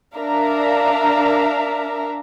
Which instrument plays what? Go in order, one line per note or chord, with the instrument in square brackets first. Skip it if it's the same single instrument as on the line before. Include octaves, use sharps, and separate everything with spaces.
[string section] D4 A#4 E5 F5 A#5